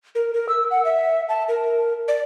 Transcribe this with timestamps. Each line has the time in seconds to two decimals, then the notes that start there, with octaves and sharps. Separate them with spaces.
0.15 A#4
0.34 A#4
0.49 E6
0.71 F#5
0.85 E5
1.29 A5
1.49 A#4
2.08 D5